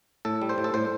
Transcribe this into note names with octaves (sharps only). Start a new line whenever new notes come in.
A2 A4
G3
C5
A2
A4
A2 C5